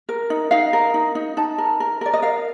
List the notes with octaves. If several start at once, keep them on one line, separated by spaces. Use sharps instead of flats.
A#4
D#4
D#4 F5
A#4
D#4
D#4
D#4 A5
A#4
A#4
A#4 D5
D#5
A#4 F5